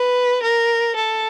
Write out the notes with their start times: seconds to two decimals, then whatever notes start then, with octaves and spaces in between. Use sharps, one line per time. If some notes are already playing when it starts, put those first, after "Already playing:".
Already playing: B4
0.43 A#4
0.96 A4